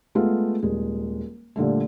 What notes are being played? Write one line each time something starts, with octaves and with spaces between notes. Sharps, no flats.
G#3 A3 B3 F4
D#1 G#3
A#2 D3 G3 A3